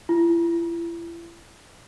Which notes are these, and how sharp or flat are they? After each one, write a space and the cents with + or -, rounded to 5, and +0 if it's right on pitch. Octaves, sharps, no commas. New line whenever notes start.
E4 +40